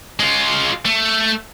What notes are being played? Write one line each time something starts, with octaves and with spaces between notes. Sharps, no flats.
G#3 F4
A3